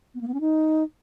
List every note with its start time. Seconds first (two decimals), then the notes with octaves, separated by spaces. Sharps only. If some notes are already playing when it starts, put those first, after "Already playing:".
0.15 B3
0.21 A#3
0.28 B3
0.34 C#4
0.41 D#4